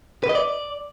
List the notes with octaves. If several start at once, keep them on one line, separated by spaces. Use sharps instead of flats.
B4
D#5
D5